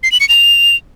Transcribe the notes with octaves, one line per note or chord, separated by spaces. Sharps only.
C7
F#7
C#7
F7